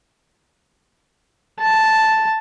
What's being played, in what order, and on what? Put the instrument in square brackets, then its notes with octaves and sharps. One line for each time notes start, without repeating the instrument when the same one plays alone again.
[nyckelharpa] A5